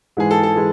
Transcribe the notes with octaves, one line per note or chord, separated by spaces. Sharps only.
G#2 E3 G#3 G#4
A4
A4
E3 G#3